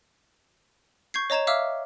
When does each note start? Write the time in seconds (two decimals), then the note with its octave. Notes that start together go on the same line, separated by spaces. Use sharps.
1.14 C#6 G6 G#6 C7
1.30 C#5 D#5 A#5 G#6 E7
1.47 E5 F5 D6 E6 F6